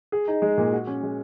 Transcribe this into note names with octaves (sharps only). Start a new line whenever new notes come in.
G#4
D#4
G#3
A#2
F#4
C#4
G#3